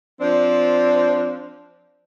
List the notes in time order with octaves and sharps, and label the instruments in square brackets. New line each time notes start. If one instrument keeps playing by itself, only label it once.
[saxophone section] F3 C4 D4